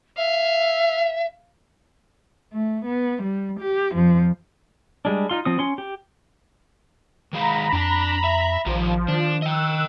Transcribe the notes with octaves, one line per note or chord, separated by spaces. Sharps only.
E5 F5
A3
B3
G3
G4
F2 F3
G3 G#3 D4
D#4 F4 C6
F3 C4 D#6
C#4 C6
G4
D#3 G#3 F5 A#5 B5
F2 D4 G5 A5
E5
A#1 D#3 F3 F4 G4
D#3 D4
D#5 G5 E6 F#6